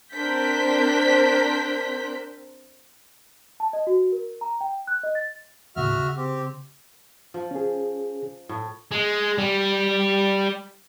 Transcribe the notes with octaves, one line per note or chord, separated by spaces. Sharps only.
C4 D4 A#4 C5 G6 B6
A5
D#5
F#4
A#4
A#5
G5
F#6
D#5
A6
D#2 A2 C#3 F#4 E5 F6
C#3
C4 G4
F3
C#4 G#4
A2
G#3
G3